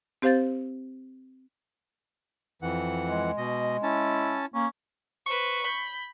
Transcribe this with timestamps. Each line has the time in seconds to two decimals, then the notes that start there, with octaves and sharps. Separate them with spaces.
0.22 C4 G4 C5 F5 G6 A6
2.62 F2 E3 F#5
3.07 G#3
3.38 B2 D#5
3.83 C#4 E4 A5
4.55 A#3 C#4
5.27 B4 C5 C#6
5.63 B5 G6